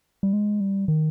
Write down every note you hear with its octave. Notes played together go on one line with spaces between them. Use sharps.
G3
G#3
G3
D#3